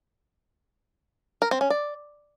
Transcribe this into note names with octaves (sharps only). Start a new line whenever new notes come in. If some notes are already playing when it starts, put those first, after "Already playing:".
A#4
C4
C#4
D5